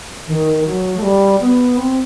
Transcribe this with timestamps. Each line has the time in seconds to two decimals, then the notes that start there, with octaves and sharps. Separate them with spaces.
0.27 D#3
0.65 F#3
0.97 A3
1.02 G3
1.40 B3
1.77 C4